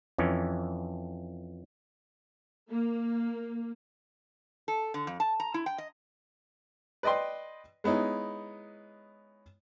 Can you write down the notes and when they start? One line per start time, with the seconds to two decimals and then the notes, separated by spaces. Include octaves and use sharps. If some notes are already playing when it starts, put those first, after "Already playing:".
0.18 F2 E3 C#4
2.70 A#3
4.68 A4
4.94 D3
5.07 F2
5.20 A5
5.40 A#5
5.54 E4
5.66 G5
5.78 D#5
7.03 B4 D5 D#5 G5 C6
7.84 G#3 B3 C#4 D#4 E4